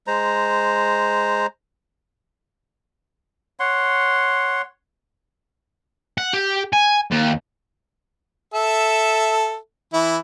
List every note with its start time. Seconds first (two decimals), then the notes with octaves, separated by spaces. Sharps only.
0.07 G#3 C5 A#5
3.60 C#5 F#5 C6
6.18 F#5
6.33 G4
6.73 G#5
7.11 D#2
8.54 A4 E5
9.93 E3 E4